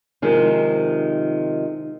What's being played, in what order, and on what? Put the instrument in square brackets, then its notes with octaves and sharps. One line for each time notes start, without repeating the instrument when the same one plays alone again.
[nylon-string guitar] C3 D#3 F3 G#3